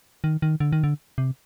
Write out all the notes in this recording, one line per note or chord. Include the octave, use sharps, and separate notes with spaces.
D#3
D#3
D3
D#3
D3
C3